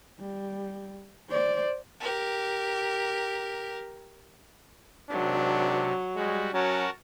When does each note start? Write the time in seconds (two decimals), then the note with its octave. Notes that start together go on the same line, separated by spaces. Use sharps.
0.20 G3
1.30 C5 D5
2.00 G4 A#4
5.11 G#1 C3 F#3 D4
6.16 G3 G#3 F#4
6.54 F#3 C#4 F#4 A#4 A5